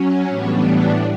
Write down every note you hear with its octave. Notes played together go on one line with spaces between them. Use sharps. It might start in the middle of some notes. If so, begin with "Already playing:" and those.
Already playing: F#3 C#4
A2 E3 G3 B3 D4 C#5